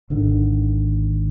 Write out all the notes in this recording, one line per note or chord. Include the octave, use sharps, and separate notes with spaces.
G#1 D3 D#3